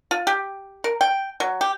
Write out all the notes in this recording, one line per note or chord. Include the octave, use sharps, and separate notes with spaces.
F4
G4
A#4
G5
F#3
G4